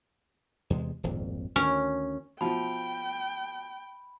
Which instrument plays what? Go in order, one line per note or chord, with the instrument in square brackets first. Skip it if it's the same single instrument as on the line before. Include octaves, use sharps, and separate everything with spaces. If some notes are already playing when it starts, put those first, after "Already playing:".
[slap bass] E2 C3 G#3
D#1 G#1 F2
[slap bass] D2 D#3 [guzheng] C#4
[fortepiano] B2 F3 [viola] G5 [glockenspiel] B5